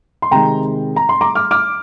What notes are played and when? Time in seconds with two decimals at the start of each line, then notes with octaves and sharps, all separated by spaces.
0.22 C6
0.31 C3 D#3 G#3 G5 A#5
0.96 A#5
1.09 C6
1.21 A#5 D6
1.35 D6 F6
1.51 D6 F6